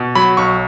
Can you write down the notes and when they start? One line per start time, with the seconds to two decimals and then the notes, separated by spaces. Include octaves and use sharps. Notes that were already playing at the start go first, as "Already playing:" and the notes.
Already playing: B2
0.15 F#3 B5
0.37 B1 C#6